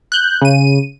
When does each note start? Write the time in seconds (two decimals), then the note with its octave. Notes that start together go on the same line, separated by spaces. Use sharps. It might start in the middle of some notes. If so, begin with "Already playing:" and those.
0.12 F#6 G6
0.42 C#3 D#7